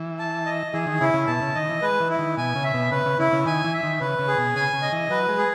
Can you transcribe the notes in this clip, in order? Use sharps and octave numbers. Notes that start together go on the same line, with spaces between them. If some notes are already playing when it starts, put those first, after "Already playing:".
Already playing: E3
A5
D#5
E3 G#4
D#3
C#3 E4
C#3
B2 A5
C#3
D#3 D#5
E3
G#3 B4
E3
E4
D#3
B2 G#5
C#3
E5
B2
C#3 B4
C#3
C#3 E4
C#3
D#3 G#5
E3
E5
D#3
C#3 B4
C#3
G#4
B2
C#3 G#5
C#3
D#5
E3
F#3 B4
G#3
G#4